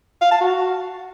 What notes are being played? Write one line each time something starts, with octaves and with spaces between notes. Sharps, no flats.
F5
A5
F#4